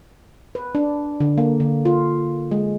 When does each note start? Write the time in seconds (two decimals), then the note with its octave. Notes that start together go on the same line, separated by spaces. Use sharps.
0.55 B4
0.75 D4
1.20 D3
1.38 A#3
1.60 D3
1.85 F4
2.51 G#3